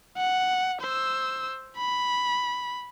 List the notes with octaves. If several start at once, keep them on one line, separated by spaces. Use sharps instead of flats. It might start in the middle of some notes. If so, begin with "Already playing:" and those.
F#5
C5 E6
B5